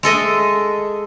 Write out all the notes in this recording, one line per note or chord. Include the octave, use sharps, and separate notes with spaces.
G#3 A4 D#5 E5